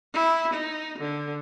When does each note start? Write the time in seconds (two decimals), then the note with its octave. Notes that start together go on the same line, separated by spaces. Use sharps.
0.14 E4
0.53 D#4
0.99 D3